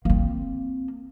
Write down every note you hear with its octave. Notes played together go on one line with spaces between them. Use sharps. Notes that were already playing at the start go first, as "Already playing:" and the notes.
A#3 C4